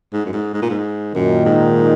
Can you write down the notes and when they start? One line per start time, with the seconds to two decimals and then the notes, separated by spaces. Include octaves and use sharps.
0.13 G#2
0.26 F#2
0.33 G#2
0.54 G#2
0.62 A#2
0.70 G#2
1.14 F#2 A#2 D#3
1.46 G#2